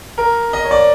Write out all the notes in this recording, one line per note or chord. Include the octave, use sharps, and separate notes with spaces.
A#4
D#5
C#5
D5